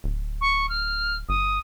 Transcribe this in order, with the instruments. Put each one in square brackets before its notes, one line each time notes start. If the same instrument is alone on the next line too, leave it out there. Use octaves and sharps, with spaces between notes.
[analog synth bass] D1
[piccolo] C#6
F6
[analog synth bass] G1 [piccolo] D#6